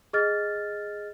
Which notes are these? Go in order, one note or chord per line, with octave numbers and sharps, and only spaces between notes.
G#4 D#5 F6 A6